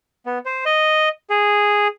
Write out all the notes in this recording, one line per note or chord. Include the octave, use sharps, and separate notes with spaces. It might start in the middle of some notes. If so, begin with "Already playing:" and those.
B3
C5
D#5
G#4